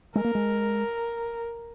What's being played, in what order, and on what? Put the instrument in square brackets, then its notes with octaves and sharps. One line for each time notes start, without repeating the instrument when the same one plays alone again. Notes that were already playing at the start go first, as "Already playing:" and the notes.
[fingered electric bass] G#3 [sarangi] A#4
[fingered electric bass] A#3
G#3